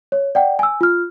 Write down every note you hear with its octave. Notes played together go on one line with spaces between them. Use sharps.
C#5
D5 F#5 G5
G#5 E6
F4 F6